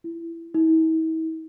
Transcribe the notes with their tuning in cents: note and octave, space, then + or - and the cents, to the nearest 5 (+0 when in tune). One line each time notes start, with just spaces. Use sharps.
E4 +15
E4 -45